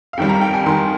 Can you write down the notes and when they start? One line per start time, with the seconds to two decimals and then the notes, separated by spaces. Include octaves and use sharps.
0.13 F5
0.17 F2 D#3 G3 G5
0.29 A#5
0.41 G5
0.54 G#5
0.66 F2 D#3 G3 C6